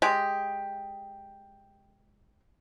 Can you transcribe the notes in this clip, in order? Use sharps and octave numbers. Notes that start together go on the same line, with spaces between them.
G#3 G4